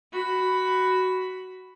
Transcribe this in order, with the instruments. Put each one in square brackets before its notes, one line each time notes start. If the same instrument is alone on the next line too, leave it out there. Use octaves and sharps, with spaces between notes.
[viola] F#4 B5